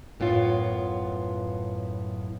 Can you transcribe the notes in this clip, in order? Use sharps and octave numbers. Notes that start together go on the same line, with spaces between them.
F#2 A2 B3 F4